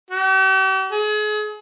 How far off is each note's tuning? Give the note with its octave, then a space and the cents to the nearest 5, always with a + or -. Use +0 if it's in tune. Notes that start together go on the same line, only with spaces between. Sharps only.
G4 -45
G#4 +35